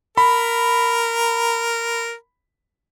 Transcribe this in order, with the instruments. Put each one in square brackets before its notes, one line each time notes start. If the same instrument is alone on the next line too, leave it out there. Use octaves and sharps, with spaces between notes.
[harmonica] A#4 [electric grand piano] B5